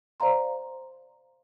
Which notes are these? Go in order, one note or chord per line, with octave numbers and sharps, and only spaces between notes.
C5 D5 F5 A#5 C6